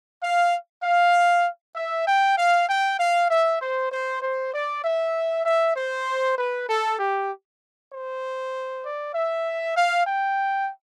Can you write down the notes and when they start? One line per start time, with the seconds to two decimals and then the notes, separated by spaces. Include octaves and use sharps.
0.23 F5
0.83 F5
1.76 E5
2.07 G5
2.38 F5
2.69 G5
3.00 F5
3.30 E5
3.61 C5
3.91 C5
4.22 C5
4.54 D5
4.84 E5
5.45 E5
5.76 C5
6.38 B4
6.69 A4
6.99 G4
7.92 C5
8.84 D5
9.14 E5
9.77 F5
10.07 G5